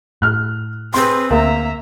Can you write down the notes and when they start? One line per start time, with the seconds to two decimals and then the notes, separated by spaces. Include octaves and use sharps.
0.22 A2 F6 F#6
0.94 C4 G#4 B4 C6
1.31 D2 A#3 E5 A#5